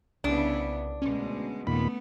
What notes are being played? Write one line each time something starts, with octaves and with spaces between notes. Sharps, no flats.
C2 C#3 B3 D4 E4
D2 B2 G#3 C#4
D#2 A#2 A3 B3 B5